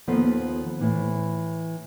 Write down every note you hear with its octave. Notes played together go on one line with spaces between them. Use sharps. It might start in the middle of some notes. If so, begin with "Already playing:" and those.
D#2 F3 B3 A4 C5
A2 E3